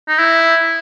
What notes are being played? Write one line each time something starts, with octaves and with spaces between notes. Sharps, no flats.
D#4
E4